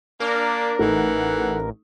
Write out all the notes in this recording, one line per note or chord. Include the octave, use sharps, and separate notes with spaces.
A#3 D4 A#4
A1 E3 A3 D#4 F#5